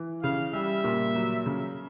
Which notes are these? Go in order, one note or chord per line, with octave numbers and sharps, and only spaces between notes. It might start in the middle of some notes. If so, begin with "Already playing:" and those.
Already playing: E3
C#3 F5
G3 E5
A#2
F#3
C#3